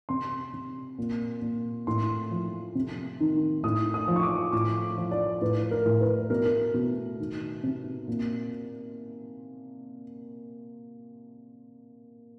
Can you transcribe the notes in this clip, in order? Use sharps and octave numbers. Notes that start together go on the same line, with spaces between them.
C3 C6
C3
A#2
A#2
A2 C6
F3
C3
D#3
A2 D#6
D#6
F3
C#6
D6
A2 D6
F3
D5
A2 B4
A#4
A2
B4
B2 A#4
A#4
B2
D#3
C3
A#2